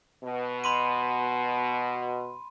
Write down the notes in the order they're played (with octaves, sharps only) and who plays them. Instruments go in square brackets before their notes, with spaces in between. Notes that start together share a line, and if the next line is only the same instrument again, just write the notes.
[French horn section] B2
[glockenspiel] B5 C6 D#7